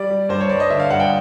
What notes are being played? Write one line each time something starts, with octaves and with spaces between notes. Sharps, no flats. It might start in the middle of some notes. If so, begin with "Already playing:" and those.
Already playing: G3 D5
G3
G2 C5
C#5
G2 D5
D#5
D3 E5
F5
G2 F#5
G5